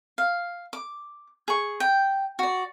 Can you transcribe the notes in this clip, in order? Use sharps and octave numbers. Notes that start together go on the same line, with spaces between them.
F5
D6
G#4 C#6
G5
F#4 D5